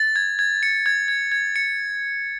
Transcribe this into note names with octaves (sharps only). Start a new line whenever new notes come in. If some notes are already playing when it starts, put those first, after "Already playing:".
Already playing: A6
G#6
G#6
C#7
G#6
G#6
G#6
C#7